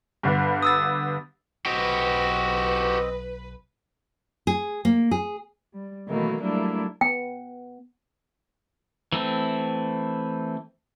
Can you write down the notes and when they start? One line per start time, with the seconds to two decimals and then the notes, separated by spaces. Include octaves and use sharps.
0.23 G2 D3 B3
0.63 D#6 E6 A6
1.66 B1 C4 F#4 G4 B4 D#5
4.47 G#4
4.85 A#3
5.11 G#4
5.73 G3
6.07 B2 D#3 E3 F#3 A3 A#3
6.41 F#3 G3 A3 A#3 D4 E4
7.01 B3 G5
9.12 E3 A3 C4